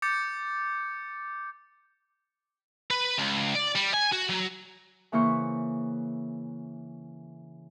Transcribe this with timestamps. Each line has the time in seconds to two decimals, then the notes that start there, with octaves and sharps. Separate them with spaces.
0.02 D6 G6 A6 C#7
2.91 B4
3.19 C#2
3.55 D5
3.75 G3
3.93 G#5
4.12 F#4
4.29 F#3
5.12 C#3 E3 A#3 E4 C5 C#6